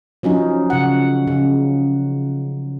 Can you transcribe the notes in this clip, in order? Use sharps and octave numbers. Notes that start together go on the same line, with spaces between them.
F3 F#3 C#4 D#4
C#3 F#5
C#3